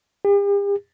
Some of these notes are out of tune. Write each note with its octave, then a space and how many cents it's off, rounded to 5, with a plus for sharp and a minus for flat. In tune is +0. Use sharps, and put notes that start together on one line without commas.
G4 +45